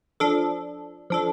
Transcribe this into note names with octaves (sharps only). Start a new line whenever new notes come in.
F3 D4 A4
F3 D4 A4